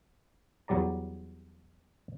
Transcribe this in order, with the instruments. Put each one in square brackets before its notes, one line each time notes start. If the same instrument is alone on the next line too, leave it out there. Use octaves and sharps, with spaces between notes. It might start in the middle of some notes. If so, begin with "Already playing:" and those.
[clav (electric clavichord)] E2 F#3 G3 D5 A#5